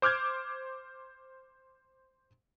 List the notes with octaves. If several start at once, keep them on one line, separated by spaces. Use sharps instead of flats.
C5 D6 F6 G6 G#6